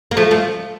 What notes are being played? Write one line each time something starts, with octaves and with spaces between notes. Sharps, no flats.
A#3
F3 A3
F3 A3